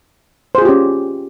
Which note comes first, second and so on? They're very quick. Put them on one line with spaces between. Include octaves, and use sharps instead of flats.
C5 G#4 F4 G4 C#4